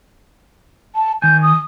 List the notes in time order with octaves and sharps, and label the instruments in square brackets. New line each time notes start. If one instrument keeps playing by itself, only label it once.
[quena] A5
[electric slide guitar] D#3 G#5 [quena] G6
[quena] D#6